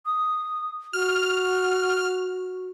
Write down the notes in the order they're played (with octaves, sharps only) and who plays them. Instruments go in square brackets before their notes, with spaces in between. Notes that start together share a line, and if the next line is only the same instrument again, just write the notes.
[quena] D#6
[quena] F#4 [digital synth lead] F6